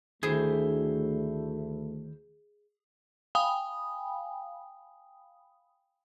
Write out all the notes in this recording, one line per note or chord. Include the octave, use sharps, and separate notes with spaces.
D2 D#3 A3 E4 G#4 C5
F5 G5 G#5 B5 D#6